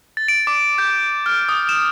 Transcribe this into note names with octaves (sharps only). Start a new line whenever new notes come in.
A6
D7
D6
G6
F6
D#6
E7